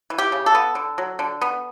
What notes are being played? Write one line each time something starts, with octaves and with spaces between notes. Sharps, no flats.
E3
G4
C#3
A4
B3
D3
F#3
D3
B3